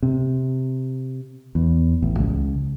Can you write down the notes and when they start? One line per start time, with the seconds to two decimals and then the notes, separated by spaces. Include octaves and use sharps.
0.03 C3
1.55 E2
2.02 A1
2.19 C#2